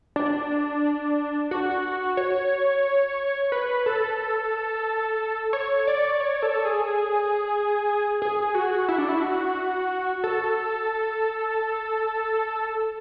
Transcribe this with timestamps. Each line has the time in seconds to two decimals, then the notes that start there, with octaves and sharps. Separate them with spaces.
0.16 D4
1.51 F#4
2.17 C#5
3.52 B4
3.86 A4
5.53 C#5
5.87 D5
6.20 C#5
6.43 A4
6.65 G#4
8.22 G#4
8.55 F#4
8.88 E4
8.98 D4
9.09 E4
9.22 F#4
10.24 A4